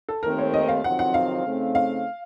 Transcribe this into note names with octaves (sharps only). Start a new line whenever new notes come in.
A4
D#2 D#3 A3 C4 A#4
C#5
D#5
F5
F2 C3 D#3 F#3 C4 F#5
F#5
F5
C#3 A3 C4 D#4
F5